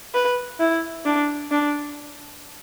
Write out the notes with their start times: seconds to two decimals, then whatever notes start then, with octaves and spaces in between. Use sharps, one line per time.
0.14 B4
0.60 E4
1.05 D4
1.51 D4